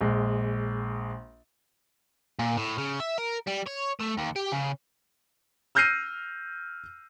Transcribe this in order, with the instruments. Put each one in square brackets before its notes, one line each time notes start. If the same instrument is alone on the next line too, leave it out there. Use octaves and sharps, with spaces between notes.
[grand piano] A#1 G#3
[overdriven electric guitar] A#2
A2
C#3
E5
A#4
G3
C#5
A3
D#2
G4
C#3
[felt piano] E6 F6 G6 A#6 C7 D#7